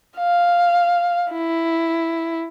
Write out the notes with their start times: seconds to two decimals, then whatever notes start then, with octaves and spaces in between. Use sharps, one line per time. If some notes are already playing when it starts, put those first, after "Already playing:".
0.17 F5
1.32 E4